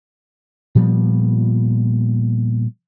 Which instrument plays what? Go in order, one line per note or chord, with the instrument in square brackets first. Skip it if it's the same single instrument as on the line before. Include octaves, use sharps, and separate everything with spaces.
[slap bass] A#2 F3 G3 B3